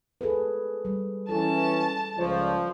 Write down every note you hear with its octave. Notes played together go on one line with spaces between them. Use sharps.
G#4 A4 B4
G3
E3 C#4 A4 A5
C#2 F3 C#5 D5